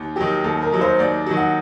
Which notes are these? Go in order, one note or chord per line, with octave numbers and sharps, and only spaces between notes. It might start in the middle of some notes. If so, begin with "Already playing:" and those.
Already playing: D#2
D#3 F#3 G4
D#2 A4
A#4
D#3 F#3
C5
D#2 D5
D#3 F#3
F#5